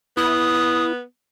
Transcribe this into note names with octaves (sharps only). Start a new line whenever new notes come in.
B3 E4 D#6